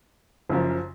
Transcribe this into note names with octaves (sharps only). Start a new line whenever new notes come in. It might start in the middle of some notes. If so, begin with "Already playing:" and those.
F#1 F#2 F3